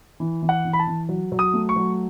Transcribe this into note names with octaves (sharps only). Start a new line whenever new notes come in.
E3
E3
F#5
E3
B5
A5
E3
F#3
F#3
D#6
A3
C#6
F#3